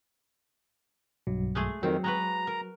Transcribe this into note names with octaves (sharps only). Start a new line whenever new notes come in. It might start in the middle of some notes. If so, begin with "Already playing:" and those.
B1 G2 F#3
G#3 A3 G#4
F2 D#3 F#3 C4
G#3 F#4 B4 A#5
A#4